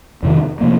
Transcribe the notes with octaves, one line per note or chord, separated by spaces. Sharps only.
F2 C3 D#3
C3 F3 A#3